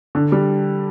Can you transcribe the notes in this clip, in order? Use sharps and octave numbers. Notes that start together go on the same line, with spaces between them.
D3
G3